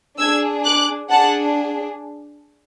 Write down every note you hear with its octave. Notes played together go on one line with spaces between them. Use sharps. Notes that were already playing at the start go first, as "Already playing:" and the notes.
D4 G#4 E6 G#6
D6 F#6
D4 G#4 F#5 A5